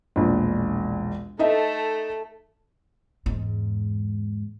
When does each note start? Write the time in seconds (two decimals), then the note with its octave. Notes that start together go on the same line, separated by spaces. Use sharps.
0.16 E1 A#1
1.39 A3 D#4 A4 D#5 E5
3.26 E2 G#2